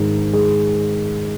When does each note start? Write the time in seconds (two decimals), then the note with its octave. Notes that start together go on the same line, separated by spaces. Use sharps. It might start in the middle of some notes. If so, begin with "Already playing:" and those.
Already playing: G#1 G#2
0.33 G#3